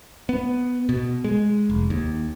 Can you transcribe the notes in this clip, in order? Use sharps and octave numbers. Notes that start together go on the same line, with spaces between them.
B3
B2
G#3
F1
D#2